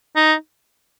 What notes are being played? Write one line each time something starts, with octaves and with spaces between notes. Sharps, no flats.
D#4